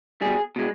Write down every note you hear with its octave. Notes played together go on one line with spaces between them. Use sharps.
B2 G3 G#4
B2 G#3